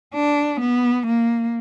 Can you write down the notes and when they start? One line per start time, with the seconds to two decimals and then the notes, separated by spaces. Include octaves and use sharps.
0.14 D4
0.61 B3
1.07 A#3